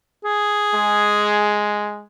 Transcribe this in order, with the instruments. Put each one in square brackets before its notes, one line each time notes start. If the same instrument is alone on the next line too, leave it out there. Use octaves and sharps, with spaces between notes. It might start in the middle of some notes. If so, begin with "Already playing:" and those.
[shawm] G#4
[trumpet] G#3